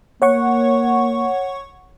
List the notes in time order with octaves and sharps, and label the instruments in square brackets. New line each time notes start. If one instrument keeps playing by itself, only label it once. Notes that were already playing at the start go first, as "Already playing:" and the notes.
[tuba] A#3 [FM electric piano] C#5 F#5 C#6